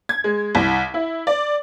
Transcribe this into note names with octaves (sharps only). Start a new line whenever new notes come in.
G#6
G#3
C2
E4
D5